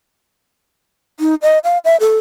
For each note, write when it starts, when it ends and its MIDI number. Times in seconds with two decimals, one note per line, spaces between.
1.20 1.35 63
1.42 1.58 75
1.64 1.78 77
1.85 1.96 76
2.00 2.19 69